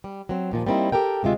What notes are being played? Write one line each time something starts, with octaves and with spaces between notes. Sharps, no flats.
G3
F#3 C4
D#2 A#2 F3
G3 A#3 C4 D#4 E4
G4 A4 A#4 G5
D2 C3 G#3 F4 E5